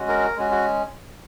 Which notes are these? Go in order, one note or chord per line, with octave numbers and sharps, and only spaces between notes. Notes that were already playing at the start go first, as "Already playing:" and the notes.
Already playing: G#3 C#4 F#4
A#4
G#3 C#4 F#4
F#4